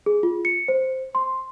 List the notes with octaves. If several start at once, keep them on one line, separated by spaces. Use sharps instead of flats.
G#4
F4
C#7
C5
C6